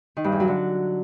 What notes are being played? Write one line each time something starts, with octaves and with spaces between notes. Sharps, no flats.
D#3
G2
E2
F#3
D3